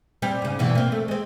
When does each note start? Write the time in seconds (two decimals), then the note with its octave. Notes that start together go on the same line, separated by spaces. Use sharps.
0.22 G3 C4
0.42 G#2 C#3
0.59 G2 B2 E3
0.75 A#3 C4
0.92 A3
1.08 G#3 C4